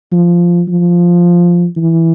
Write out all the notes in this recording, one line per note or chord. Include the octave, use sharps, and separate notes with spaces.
F3
F3
E3